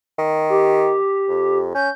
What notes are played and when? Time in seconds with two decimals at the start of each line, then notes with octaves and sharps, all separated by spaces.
0.18 D#3
0.50 G4
1.28 F2
1.75 C#4 G6